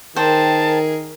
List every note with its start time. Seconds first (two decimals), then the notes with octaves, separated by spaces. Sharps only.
0.16 D#3 G#4 A#4 C5 G5 A5